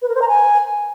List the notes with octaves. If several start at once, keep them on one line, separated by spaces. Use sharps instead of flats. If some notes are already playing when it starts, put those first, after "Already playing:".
B4
A#4
C5
A#5
G#5